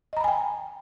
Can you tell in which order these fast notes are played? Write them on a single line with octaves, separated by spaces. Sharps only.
D#5 A#5 B5 G#5 G5